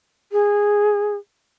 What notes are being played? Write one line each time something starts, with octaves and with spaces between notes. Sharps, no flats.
G#4